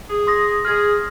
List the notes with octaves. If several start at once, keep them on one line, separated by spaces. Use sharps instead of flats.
G#4
C6 D#6 A#6
G#4 F6 G#6